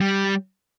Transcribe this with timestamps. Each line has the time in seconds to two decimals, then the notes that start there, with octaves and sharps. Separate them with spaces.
0.01 G3